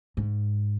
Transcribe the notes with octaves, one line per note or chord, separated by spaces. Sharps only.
G#2